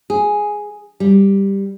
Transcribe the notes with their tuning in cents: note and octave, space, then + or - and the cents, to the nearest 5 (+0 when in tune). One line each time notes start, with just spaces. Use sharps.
G#4 +0
G3 +5